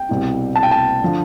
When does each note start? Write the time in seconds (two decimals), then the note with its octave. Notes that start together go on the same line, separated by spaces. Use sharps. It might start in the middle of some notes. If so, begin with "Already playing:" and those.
Already playing: G5
0.09 C2 B2 G3 C4 E4
0.55 A5
0.63 G5
0.71 A5
1.03 D3 F3